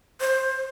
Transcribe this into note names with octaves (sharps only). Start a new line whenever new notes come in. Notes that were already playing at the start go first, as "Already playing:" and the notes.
C5